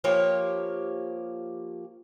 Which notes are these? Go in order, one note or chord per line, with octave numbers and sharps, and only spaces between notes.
F3 A#3 G4 C#5